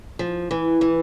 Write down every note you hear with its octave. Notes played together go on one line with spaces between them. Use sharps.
F3
E3
E3